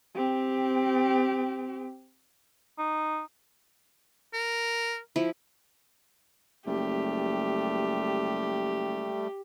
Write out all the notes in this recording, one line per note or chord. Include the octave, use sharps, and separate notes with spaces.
C4 G4
D#4
A#4
F3 E4
F#1 G3 A3 G4